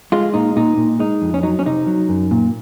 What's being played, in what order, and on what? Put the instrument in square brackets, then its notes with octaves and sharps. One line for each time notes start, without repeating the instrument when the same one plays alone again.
[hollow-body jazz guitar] G#3 F4
A#2 D#4
A#2 D#4
A#2
G#3 D#4
F2
C#4
F#3 D#4
C#4
C3 D#4
F#3
F#2
A#2